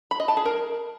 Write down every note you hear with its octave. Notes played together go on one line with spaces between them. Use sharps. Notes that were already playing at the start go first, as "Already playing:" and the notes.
B5
D#5
A5
G#4
A#4